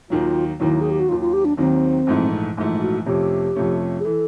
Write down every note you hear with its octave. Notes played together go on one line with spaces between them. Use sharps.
D#2 D#3 F#3 F4
D#2 D#3 F#3 E4
G#4
G4
F#4
D#2 D#3 F#3 F4
F4
G4
D4
D#2 D#3 F#3 C4
A#1 G#2 E3 A3
A#1 G#2 E3 A3
F#4
F2 C3 F3 A3 C#4 G4
F2 C3 F3 A3 C#4
G#4
E3 A4